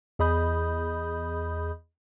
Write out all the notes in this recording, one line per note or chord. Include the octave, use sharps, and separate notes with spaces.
E2 G#4 D#5 B5 D#6 G6